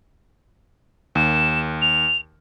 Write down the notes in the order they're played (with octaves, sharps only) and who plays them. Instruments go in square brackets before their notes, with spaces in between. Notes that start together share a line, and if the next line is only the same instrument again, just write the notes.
[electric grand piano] D#2 [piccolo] E7
[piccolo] F7